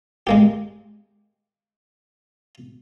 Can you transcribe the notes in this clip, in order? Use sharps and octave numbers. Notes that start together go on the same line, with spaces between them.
G#3 A#3 G4